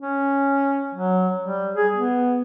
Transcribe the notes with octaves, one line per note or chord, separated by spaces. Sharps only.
C#4
F#3
G3
G#4
B3